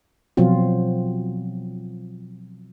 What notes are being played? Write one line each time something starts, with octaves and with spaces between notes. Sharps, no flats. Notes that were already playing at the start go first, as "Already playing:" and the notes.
B2 F3 F#3 C4 F4